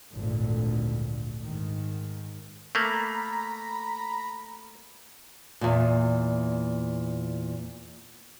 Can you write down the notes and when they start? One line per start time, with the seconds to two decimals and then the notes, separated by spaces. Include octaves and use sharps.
0.14 G#1 D2 A#2 D3
1.43 G#2 D#3
2.75 A3 A#3 A#5 B5
5.61 E2 A#2